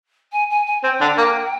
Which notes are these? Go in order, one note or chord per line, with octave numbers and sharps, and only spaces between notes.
G#5
G#5
G#5
C4 G5
D3 D4
A#3